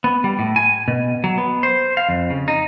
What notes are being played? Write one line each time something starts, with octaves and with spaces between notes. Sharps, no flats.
B3
G3
A2
G#5
B2
F#3
B3
C5
F5
F2
C#3
D#4